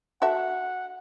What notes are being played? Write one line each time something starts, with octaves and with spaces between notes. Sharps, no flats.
F#4 A4 E5 F#5